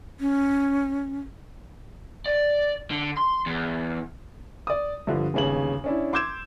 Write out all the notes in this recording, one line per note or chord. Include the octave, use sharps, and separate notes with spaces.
C#4
D5
D3
C6
E2
D5 D#6
G2 D3 F3
G1 D#2 C#3 G#5 F#7
C#4 D4 E4
C6 D6 E6 G6 G#6 E7